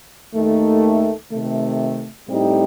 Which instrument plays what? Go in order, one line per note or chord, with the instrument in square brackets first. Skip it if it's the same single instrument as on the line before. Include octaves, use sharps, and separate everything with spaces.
[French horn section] D#2 D#3 A3
C3 D#3 A3
A2 G3 C4 D#4 G4